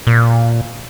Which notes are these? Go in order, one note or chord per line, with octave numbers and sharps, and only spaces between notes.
A#2